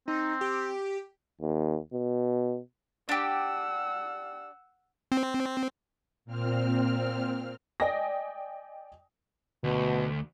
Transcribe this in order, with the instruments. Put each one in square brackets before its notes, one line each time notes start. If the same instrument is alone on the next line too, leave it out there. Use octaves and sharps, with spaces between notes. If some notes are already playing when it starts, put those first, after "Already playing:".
[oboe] C4 [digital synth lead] D#4
[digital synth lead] G4
[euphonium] D#2
B2
[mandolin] D4 G4 [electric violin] F#5 E6
[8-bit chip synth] C4
[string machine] A#2 C4 F6
[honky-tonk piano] D5 D#5 G5 G#5 D#6 A#6
[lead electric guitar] D2 [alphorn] B2